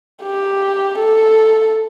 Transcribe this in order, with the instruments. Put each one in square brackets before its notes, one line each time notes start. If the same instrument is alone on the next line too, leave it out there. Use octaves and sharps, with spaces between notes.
[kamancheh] G4
A4